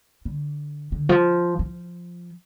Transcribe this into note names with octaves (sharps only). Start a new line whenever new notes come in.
D3
D3
F3
F3